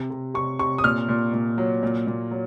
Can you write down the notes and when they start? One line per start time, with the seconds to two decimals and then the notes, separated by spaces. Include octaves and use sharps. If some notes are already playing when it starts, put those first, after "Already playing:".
Already playing: C3
0.10 C3
0.34 C3 C#6
0.59 C3 C#6
0.78 D#6
0.84 A#2 F6
1.09 A#2
1.33 A#2
1.58 F#3
1.83 A#2
2.07 A#2
2.31 F#3